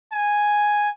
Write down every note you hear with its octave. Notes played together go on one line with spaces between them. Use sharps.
G#5